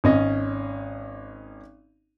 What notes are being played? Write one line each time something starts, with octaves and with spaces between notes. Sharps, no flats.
G#1 C#4 D#5